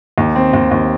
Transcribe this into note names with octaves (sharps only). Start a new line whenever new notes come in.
D#2
C4
D#2
D#2